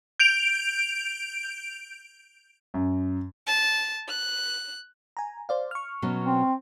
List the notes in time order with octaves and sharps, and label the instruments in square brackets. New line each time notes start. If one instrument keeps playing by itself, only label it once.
[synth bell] G6 D7 F7
[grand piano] F#2
[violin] A5
F#6
[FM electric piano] G#5 A#5
C5 D5 F5
C#6 F6
[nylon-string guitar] B2 F#3 C#4
[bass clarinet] C4